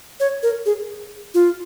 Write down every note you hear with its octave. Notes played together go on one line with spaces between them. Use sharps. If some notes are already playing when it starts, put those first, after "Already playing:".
C#5
A#4
G#4
F4